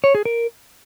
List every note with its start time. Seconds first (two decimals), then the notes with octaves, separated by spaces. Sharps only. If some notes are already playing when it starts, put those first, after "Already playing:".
0.04 C#5
0.15 G#4
0.25 A#4